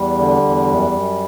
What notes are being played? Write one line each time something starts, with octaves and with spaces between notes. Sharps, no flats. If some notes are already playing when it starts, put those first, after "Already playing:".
Already playing: E2 G3
D3
E2
F#2
F#2